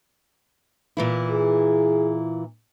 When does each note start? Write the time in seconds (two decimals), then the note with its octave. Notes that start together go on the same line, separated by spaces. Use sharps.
0.97 A#2 E3 E4
1.31 G#4